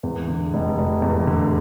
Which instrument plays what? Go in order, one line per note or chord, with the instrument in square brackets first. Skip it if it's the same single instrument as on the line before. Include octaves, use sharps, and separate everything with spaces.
[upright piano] E2
D3
F1
F1
E2
D3